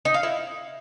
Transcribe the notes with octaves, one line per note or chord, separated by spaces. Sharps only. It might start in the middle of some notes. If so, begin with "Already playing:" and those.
D#4
F5
E4